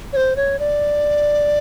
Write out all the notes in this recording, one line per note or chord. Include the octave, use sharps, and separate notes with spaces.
C#5
C5
C#5
D5